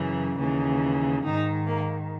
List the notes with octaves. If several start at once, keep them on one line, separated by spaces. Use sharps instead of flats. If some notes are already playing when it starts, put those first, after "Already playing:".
Already playing: F#2 C#3 E3
D#2 C#3 E3
G#2 D#3 D#4
A#3